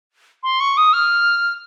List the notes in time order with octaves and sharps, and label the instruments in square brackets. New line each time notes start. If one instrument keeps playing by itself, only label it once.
[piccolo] C6
C#6
D#6
F6